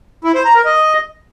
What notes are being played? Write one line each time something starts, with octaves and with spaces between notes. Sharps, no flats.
E4
C5
A#5
A#4
D#5